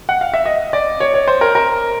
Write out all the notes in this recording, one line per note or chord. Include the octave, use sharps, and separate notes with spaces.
F#5
F5
E5
D#5
D5
C#5
C#5
C5
A#4
A#4